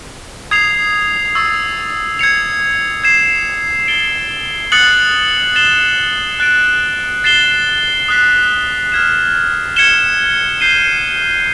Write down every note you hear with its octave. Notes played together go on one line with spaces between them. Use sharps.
D#6 G#6 C7 F7
C#6 E6 A6
G#6 C#7 F7
G#6 C7 E7
A6 D7 G7
D#6 F#6 A6 C#7 F#7
A6 C7 E7 G7
F#6 A6 D7
A6 C7 E7 G7
D#6 F#6 B6
F6 G#6 B6 E7
G#6 C#7 E7 G7
G6 C7 D#7 G7